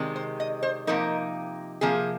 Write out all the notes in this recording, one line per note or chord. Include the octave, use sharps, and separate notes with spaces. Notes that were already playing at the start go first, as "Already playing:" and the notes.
Already playing: C3 D#3 G#3
C5
D#5
C5
C3 F3 A#3 D#4 A#4
C3 F3 A#3 G#4